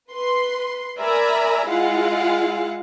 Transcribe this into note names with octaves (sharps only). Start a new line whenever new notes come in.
B4 C6
A#4 D5 E5 G#5 A#5 B5
G#3 E4 F4 F5 F#5